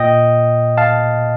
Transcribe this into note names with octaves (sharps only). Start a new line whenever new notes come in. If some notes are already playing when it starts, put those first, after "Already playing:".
Already playing: A#2 D#5 G5
F5 A5